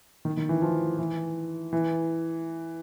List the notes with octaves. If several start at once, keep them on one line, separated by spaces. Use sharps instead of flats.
D#3
D#3
E3
F3
E3
E3